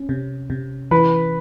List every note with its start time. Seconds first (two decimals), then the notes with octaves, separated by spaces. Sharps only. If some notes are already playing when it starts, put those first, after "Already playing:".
Already playing: C#4
0.09 C3
0.50 C3
0.91 E3 B4